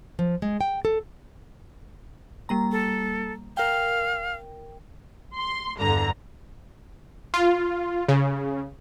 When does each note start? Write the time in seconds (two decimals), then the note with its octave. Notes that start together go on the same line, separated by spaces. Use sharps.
0.19 F3
0.42 G#3
0.61 G5
0.85 A4
2.49 G3 A#3 A#5
2.72 A4
3.57 A#4 F5 G5
5.36 C6
5.79 E2 G2 D3 A#5
7.34 F4
8.09 C#3